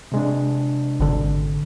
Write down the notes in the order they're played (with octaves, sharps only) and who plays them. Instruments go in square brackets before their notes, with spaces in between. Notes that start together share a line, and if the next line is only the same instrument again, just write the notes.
[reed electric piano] C3 G#3 D4
[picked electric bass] G#1 D3